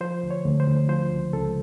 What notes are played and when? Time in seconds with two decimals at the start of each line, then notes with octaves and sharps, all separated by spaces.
0.01 F3 C5
0.23 D2
0.31 C#5
0.45 D2
0.60 C5
0.67 D2
0.89 F3 C5
1.12 C#2
1.33 C#2 A4